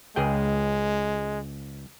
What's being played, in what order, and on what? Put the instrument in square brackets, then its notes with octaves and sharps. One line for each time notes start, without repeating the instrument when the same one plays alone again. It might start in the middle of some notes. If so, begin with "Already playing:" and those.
[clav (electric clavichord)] C#2 G#4 G5 [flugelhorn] G#3